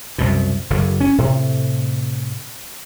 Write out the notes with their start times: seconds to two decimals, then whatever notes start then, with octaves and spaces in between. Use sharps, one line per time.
0.18 C2 F#2 B2
0.70 F#1 D3
1.00 C#4
1.18 A2 C3